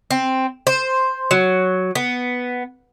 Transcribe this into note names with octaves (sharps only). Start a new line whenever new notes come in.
C4
C5
F#3
B3